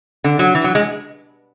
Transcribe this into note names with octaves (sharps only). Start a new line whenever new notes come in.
D3
F#3
E3
F#3
G#3